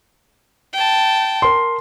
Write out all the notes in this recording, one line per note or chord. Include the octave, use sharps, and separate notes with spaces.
G5 A5
A#4 C6